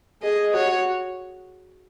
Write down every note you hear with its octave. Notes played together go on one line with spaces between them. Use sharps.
G#4 D#5
F#4 C#5